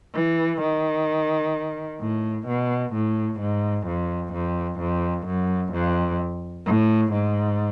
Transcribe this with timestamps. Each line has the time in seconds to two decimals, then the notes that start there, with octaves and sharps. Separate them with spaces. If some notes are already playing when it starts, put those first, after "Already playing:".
0.14 E3
0.61 D#3
2.01 A2
2.47 B2
2.93 A2
3.40 G#2
3.86 F2
4.33 F2
4.79 F2
5.26 F#2
5.73 F2
6.66 A2
7.13 G#2